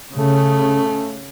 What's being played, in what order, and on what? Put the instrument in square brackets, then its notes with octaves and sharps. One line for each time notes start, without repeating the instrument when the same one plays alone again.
[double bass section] C#3 [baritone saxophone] A3